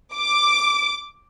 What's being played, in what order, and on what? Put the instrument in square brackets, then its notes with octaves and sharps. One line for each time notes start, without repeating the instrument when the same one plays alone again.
[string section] D6